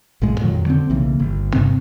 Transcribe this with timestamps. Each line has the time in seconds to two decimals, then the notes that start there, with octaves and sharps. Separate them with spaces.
0.22 A#1 A2 G#3
0.41 F2 A#2 D#3 F#3
0.66 D3 C4
0.90 B1 C#3 E3 A#3
1.19 G1
1.53 G2 C3 C4